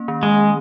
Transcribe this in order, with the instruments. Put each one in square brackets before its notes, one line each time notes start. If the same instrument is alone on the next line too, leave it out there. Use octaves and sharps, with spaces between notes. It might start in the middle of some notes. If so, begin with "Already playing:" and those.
Already playing: [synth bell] A#3 C#4
D#3
[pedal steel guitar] G#3